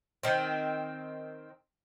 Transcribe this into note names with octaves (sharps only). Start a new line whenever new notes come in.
D#3 C4